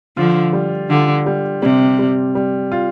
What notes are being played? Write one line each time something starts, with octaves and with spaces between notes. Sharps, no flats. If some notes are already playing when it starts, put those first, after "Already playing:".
D3 F3 F4
G3
D3 F4
G3
C3 G3
G3
G3
F4